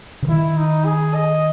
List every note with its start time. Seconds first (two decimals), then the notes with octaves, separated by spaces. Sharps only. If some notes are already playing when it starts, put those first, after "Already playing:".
0.22 C#3
0.28 D#3 E4
0.57 D#4
0.86 G#4
1.14 D#5